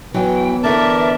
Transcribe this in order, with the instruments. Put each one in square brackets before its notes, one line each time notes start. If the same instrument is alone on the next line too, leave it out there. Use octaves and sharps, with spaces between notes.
[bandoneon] E3 [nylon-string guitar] F#3 E4 [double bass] B3 [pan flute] G5
[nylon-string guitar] D3 E3 C#5 [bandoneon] A#4 D5 A5 [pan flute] E5